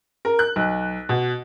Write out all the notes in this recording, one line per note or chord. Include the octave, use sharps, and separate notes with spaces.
A#4
F#6
B1
B2